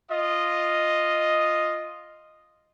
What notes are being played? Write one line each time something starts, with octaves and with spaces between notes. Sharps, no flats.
F4 D#5